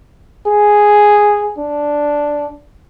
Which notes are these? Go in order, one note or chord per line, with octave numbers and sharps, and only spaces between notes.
G#4
D4